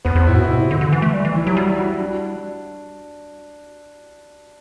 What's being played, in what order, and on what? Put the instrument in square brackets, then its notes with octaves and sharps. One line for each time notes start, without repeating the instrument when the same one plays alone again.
[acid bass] E2 [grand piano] B3
[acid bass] E2 [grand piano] C4
[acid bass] A2 [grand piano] E4
[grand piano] F#4
[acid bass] G2 [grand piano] E4
[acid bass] B2
C3
D3
D3
E3
A3
G3
E3
[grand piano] E4
[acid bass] F#3 [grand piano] G4
[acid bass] G3 [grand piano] F#4
[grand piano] E4
F#4
E4
D4